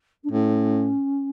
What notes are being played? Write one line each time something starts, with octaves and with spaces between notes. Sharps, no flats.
D4
A2 C#4